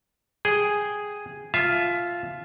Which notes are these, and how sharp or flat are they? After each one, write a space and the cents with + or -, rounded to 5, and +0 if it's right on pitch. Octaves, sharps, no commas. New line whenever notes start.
G#4 +0 G5 +0
F4 +0 E5 +15 A5 -35